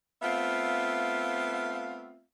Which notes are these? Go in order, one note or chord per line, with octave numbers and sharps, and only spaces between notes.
A3 B3 C4 F4 E5 F5